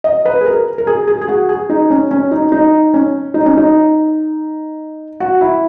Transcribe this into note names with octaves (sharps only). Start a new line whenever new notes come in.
D#5
B4
G#4
A#4
A#4
G#4
G#4
G#4
F#4
G#4
D#4
C#4
C#4
D#4
D#4
C#4
D#4
C#4
D#4
F#4
E4